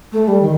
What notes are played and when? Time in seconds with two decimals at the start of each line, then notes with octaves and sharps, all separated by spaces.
0.12 A3
0.28 G3
0.42 D#3